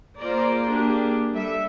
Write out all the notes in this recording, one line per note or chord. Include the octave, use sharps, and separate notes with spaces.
A#3 F4 G#4 C5 D5 A#5
A#3 D4 G4 G#4
G3 A4 E5